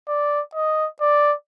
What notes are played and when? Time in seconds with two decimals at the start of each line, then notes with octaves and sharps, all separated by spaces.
0.08 D5
0.54 D#5
1.01 D5